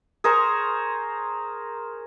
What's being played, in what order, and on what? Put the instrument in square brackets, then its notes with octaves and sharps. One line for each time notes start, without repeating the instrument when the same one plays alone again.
[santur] G#4 A#4 C5 C#6